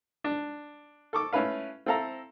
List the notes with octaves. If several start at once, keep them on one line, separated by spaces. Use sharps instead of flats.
D4
A4 C#6 D6
A3 C#4 E4 B4 F5
C4 E4 A4 F5 A#5